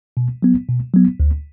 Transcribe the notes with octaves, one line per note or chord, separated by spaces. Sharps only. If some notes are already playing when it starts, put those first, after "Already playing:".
B2
F#3 B3
B2
F#3 B3
D2